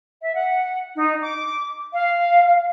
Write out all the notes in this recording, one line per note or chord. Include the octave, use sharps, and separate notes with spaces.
E5
F#5
D#4
D6
F5